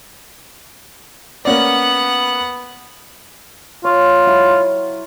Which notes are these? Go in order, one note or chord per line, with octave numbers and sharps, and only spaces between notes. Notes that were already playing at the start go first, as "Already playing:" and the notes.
A#3 B3 C#4 D5 F#5 F#6
F4 C#5
F#3 E4